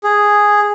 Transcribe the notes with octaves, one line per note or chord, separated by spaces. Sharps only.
G#4